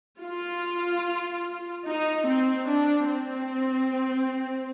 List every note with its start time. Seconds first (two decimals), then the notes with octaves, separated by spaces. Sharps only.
0.21 F4
1.86 D#4
2.26 C4
2.68 D4
3.08 C4